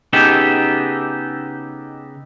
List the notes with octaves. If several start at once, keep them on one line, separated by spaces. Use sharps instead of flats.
C#3 B3 D#4 G4 A4